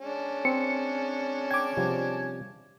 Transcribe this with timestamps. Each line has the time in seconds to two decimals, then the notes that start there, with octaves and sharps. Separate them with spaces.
0.01 G#3 C#4 D4
0.45 C4 C#7
1.51 G5 D6 G#6
1.77 C3 F3 G3